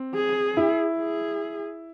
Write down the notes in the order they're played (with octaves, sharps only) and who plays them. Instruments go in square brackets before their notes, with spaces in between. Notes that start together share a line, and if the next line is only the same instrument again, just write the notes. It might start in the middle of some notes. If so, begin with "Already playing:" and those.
Already playing: [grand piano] C4
[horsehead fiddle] G#4
[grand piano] E4
[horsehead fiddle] G#4